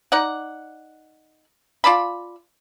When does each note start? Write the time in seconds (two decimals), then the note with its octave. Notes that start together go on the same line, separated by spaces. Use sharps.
0.12 D#4 D5 F#5
1.84 F4 D5 A5 B5